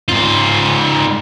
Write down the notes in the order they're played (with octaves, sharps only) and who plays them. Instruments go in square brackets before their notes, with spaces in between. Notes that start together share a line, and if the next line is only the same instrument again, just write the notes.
[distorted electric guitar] G#2 F4